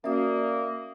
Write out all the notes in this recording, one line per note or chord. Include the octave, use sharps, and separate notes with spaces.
A#3 C#4 F#4 D5 E5 D#6